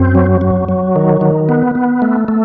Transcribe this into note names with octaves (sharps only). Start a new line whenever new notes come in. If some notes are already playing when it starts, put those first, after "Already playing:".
Already playing: F#2 C4
F#3
F#3
F#3
D#3
D#3
B3
B3
A3
A3